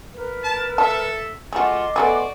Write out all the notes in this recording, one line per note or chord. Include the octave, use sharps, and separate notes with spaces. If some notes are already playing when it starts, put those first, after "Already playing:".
A#4 B4
A5
A4 E5 A5
A3 F4 F#4 G#4 D#5 C6 D6
A3 B3 F#4 G#4 D5